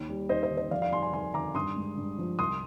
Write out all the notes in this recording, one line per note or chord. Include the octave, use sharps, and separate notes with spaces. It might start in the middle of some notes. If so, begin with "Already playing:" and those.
Already playing: D#2
G3
D#2 C5 D#5
C5 D#5
D#3
C5 D#5
F2 D5 F5
D5 F5
G3 G#5 C6
G#5 C6
F2 G#5 C6
D#3 A#5 D6
G2 C6 D#6
G#3
G2
F3
C2 C6 D#6